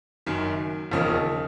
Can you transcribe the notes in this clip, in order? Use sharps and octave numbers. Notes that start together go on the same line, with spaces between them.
F#1 F#2 D#3
E1 D#2 C#3 F3